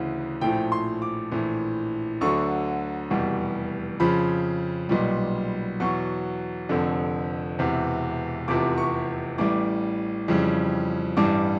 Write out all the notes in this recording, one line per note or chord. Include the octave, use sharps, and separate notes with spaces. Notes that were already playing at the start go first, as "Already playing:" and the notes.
Already playing: D2 C#3 E3
A#1 A2 F3 G5
C6
D6
A#1 A2 E3
D2 D3 F#3 C#6
F1 E2 B2 G3
F2 C#3 F3 B5
B1 A#2 G3
E2 B2 F#3 C#6
F1 F2 D3
E1 E2 C3
F1 E2 C3 F3 D6
C#6
A1 A2 E3 G3 D6
F2 C#3 E3 G3
A1 G2 E3 G3 D6